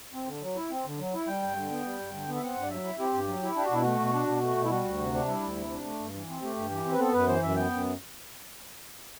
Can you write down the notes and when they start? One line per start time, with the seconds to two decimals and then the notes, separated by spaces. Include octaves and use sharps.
0.13 C4
0.27 D3
0.42 F#3
0.56 E4
0.71 C4
0.85 D3
0.99 F#3
1.14 E4
1.27 G3 G5
1.42 G2
1.56 D3
1.71 B3
1.85 G3
1.99 G2
2.13 D3
2.28 B3
2.35 E5
2.43 C4 F#5
2.56 G2
2.62 D5
2.70 F#3 E5
2.84 E4
2.99 C4 G4
3.14 G2
3.28 F#3
3.43 E4
3.56 D4 G4
3.65 F#4
3.71 B2 E4
3.83 A3 F#4
4.00 B2
4.13 D4
4.27 B2
4.42 A3
4.56 B2
4.65 E4
4.70 G3 F#4
4.85 D2
4.99 C3
5.13 D4
5.27 G3 E4
5.42 D2
5.56 C3
5.71 D4
5.85 A3
5.99 G2
6.14 E3
6.28 C4
6.42 A3 G4
6.56 G2
6.70 E3
6.85 C4
6.92 B4
6.99 B3 A4
7.13 F#2 B4
7.27 E3 C5
7.42 F#2 E5
7.56 B3 G5
7.71 F#2